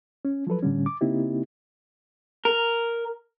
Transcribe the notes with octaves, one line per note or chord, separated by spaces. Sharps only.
C#4
F3 F#3 A4 B4
A2 D3 G3 C#4
D6
C#3 A#3 C4 D#4 E4 G4
A#4